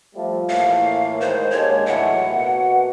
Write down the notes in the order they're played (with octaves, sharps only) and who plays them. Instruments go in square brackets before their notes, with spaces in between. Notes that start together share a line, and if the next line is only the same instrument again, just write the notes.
[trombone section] F3 G3 A3
[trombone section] A2 E3 A#3 [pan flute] F5
[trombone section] D#3 G#3 [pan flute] C5
[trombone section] D#2 D3 G#3 [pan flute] C#5
[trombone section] A2 E3 F#3 [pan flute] F#5
[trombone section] B2 A#3 F#4